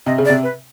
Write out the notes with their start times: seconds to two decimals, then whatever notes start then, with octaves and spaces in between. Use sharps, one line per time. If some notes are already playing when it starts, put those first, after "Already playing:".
0.06 C3 D#5
0.18 C#3
0.25 D5
0.30 C3
0.43 B4